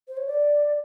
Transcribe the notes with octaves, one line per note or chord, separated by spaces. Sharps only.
C5
C#5
D5